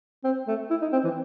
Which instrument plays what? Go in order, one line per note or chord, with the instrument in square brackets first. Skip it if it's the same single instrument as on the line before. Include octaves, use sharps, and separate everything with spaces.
[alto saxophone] C4
A3
E4
D#4
C4
E3